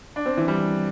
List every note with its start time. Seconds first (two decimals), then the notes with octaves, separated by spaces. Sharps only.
0.16 D4
0.26 C4
0.37 E3
0.48 G3